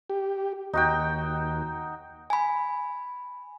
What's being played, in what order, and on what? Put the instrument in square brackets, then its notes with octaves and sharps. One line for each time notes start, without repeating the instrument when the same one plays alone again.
[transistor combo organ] G4
[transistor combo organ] D#2 [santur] D#4 F#4 G5
[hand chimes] G#5 B5